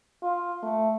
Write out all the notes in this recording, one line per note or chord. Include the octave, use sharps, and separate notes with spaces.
F4
A3